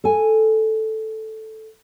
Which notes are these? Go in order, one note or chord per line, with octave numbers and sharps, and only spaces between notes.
A4 G#5